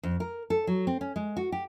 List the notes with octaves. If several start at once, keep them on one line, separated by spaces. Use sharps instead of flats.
F2
A#4
A4
F#3
C4
C#4
G#3
F#4
G4